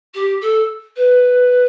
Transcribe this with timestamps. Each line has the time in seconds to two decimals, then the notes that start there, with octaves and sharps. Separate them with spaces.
0.14 G4
0.41 A4
0.96 B4